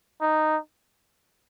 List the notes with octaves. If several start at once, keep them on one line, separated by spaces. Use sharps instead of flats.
D#4